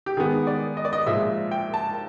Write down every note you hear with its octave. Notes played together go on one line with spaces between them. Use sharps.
G4
D#3 G#3 B3 G#4
D5
D#5
D5
D#5
A#2 F3 G#3 E5
G5
A5